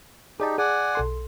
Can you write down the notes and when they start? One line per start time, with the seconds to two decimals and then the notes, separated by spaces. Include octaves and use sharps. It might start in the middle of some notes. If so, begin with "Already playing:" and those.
0.40 D#4 G4 G#4 D5 A5
0.58 G#4 D5 F#5 G#5
0.95 B1 A4 C6